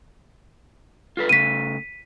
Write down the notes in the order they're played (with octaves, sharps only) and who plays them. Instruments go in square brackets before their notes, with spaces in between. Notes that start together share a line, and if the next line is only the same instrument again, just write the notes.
[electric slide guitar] F4 A4 B4
[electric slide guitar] C#3 A3 [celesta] B6 D#7